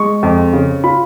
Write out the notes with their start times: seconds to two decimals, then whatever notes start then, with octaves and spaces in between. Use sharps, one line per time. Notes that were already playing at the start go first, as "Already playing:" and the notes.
Already playing: G#3 C#6
0.23 F2
0.53 C#3
0.84 F4 B5